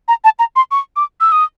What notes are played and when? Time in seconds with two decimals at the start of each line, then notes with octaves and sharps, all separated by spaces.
0.08 A#5
0.24 A5
0.39 A#5
0.56 C6
0.71 C#6
0.96 D6
1.21 E6
1.32 D#6